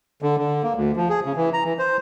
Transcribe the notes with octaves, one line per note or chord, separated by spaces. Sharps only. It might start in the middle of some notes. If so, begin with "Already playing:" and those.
D3
D3
A#3
D2
F3
G#4
C#3
E3
A#5
E3
C5